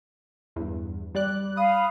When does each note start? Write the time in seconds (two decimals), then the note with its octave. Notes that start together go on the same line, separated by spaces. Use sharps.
0.56 E2 G2
1.15 G3 D5 F#6
1.57 F5 B5 D#6